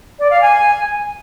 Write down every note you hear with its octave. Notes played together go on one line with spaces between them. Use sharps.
D5
F5
G#5